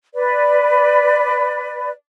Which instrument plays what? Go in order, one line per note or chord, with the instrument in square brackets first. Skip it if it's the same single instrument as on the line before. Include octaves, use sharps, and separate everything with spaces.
[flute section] B4 D5